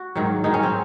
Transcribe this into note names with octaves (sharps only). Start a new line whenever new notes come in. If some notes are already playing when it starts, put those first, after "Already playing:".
Already playing: F#4
G#2 D#3 F#3
G#2 D#3 F#3 D#4
C#4
C4